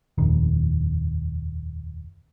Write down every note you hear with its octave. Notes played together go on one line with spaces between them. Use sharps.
F1 A#1 D#2